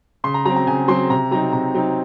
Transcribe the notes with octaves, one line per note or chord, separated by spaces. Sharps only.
C#3 C6
A#5
F#3 C4 A#5
A#5
C#3 G#5
F#3 C4 C6
C3 A#5
F#3 C4 D#4 A#5
C3 A#5
F#3 C4 D#4